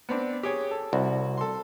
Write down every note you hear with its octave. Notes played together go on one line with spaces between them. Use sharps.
B3 C4 D4
G4 G#4 C#5
A4
C2 F#4
A4 C6